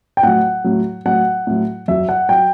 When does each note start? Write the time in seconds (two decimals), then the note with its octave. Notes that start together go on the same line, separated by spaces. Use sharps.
0.17 G5
0.23 A2 F#3 F#5
0.64 A2 F#3
1.05 A2 F#3 F#5
1.47 A2 F#3
1.88 F#2 F#3 E5
2.09 F#5
2.29 F#3 G5